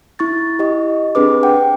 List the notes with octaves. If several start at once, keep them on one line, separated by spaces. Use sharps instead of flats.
E4 C#6 A6
G4 D#5
C4 D4 G#4 B4 D6
F#5 G5